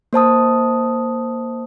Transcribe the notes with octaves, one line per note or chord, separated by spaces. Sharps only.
A#3 C5 A5 D#6